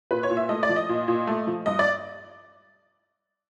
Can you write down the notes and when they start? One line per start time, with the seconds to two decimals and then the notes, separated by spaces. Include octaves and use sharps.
0.11 A#2 B4
0.23 C#5
0.30 A#2
0.37 E5
0.49 A3 D#5
0.63 D5
0.69 F3
0.76 D#5
0.89 A#2
1.08 A#2
1.27 A3
1.47 F3
1.66 G2 D#5
1.79 D5